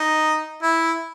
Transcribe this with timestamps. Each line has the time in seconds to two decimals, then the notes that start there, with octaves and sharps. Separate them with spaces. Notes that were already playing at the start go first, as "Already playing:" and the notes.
Already playing: D#4
0.62 E4